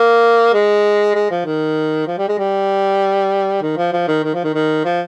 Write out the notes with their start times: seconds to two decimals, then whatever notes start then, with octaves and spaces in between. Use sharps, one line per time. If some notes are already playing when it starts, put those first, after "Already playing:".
Already playing: A#3
0.54 G#3
1.15 G#3
1.31 F3
1.46 D#3
2.07 F3
2.18 G3
2.28 G#3
2.39 G3
3.62 D#3
3.77 F3
3.93 F3
4.08 D#3
4.24 D#3
4.34 F3
4.44 D#3
4.54 D#3
4.85 F3